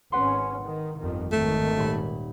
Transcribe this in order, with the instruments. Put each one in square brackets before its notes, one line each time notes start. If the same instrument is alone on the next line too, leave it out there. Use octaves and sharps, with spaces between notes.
[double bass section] G#1 C#4 [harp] B4 F#5 C6
[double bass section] D#3
G1 F2 D#3
[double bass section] G#1 D#3 [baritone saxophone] A3
[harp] D#1 B5